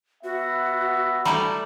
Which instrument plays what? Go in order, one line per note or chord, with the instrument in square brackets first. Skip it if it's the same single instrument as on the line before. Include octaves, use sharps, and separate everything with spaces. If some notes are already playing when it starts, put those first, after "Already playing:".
[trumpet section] B3 E5 [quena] F#4
[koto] G3 A3 E4 [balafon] A#5 B5